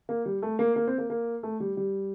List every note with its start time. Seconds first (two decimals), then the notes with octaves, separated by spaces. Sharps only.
0.09 A#3
0.26 G3
0.42 A3
0.59 A#3
0.76 A#3
0.87 C4
0.98 A#3
1.10 A#3
1.43 A3
1.60 G3
1.77 G3